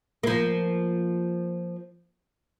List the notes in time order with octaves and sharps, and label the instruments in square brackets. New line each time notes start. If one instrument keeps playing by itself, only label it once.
[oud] F3 A#3